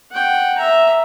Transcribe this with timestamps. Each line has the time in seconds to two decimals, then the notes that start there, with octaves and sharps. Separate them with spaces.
0.11 F#5 G5
0.58 E5 A#5